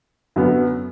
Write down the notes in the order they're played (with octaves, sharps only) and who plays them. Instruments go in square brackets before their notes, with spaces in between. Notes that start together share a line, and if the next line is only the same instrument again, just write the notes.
[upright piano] F#2 D3 F#3 B3